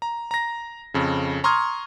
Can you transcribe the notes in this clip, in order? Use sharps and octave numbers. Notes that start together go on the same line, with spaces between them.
A#5
A#5 A#6
F2 C#3
A#5 C6 C#6 D#6 F6 G#6